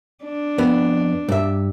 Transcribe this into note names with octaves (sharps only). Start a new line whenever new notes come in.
D4
F2 B3
G2 E5